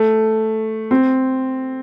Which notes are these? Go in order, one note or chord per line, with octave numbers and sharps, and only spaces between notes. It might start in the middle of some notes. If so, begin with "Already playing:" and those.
Already playing: A3
C4